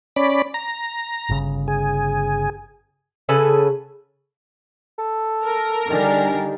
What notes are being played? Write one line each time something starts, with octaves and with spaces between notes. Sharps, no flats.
C#4 D5 B5
A#5
G1 C#3
G#4
C#3 A4 B4 G#5
A4
A#4
D3 D#3 G3 D4 G4 G#4